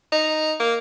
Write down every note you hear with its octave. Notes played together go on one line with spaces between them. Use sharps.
D#4
A#3